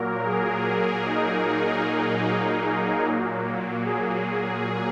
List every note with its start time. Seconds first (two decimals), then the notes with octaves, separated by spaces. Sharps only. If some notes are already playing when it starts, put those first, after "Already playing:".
Already playing: A#2 F#3 A#3 A#4
0.25 G#4
0.66 G#4
1.06 D#4
3.05 A#2 F#3 A#3
3.85 G#4